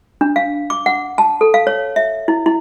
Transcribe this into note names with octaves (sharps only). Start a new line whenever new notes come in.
D4
F5
D6
F#5
A5
A4
F5
C#5
E5
E4
E4